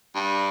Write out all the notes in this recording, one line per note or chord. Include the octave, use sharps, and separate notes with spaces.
G2